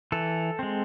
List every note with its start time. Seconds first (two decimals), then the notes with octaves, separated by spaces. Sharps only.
0.12 E3 A4
0.59 G#3 C4